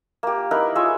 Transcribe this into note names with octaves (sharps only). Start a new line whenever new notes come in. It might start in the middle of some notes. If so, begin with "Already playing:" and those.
A#3 G4
D#4 E4 A#4 B4
F4 G#4 C#5 E5